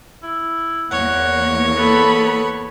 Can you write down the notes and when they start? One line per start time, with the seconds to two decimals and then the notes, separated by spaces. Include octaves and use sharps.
0.23 E4
0.91 E2 A#3 C#5 F#5
1.77 B3 A4 B5